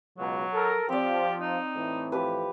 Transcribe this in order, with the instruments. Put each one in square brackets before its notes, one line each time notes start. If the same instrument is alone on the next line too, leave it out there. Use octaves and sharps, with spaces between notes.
[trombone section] C#2 B2 [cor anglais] F#3
[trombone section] A4 A#4
[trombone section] F3 [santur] C4 D5 [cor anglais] G4
[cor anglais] D#4
[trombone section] A2 E3
[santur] F3 G4 B4